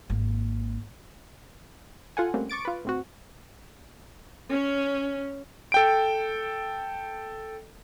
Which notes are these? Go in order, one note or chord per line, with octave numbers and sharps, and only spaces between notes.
G#1 A#3
F4 A4 F#5 G#5
G3 A3 A#3 C4 C#4
C#6 D6 A6 D7
F4 B4
A2 C4 F#4
C#4
A4 G5 D7